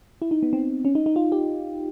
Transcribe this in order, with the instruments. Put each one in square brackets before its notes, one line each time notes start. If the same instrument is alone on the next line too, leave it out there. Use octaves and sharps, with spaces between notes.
[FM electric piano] E4
D#4
B3
C4
C#4
D#4
D#4
F4
G4